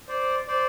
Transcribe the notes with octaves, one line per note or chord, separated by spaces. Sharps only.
C5 D5
C5 D5